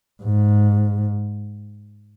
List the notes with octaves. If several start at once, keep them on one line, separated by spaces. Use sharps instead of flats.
G#2